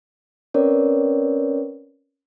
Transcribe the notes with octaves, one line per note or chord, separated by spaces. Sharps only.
C4 C#4 A#4 B4 C#5 D5